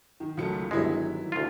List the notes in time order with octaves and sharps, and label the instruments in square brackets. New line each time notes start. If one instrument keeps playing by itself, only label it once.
[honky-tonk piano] D#3
[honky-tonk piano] C#2 C#7 [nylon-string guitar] D#3 F#3 A3
[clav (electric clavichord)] G1 G#3 [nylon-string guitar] D#3 F#3 [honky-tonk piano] E3 E4
[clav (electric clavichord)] D2 F4